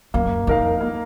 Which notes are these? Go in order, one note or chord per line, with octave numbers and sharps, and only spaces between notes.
F#2 A#3
F2 D#4 A#4 F5
A#3